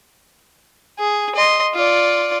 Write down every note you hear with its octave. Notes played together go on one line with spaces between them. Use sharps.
G#4
D#5 C6
F4 D5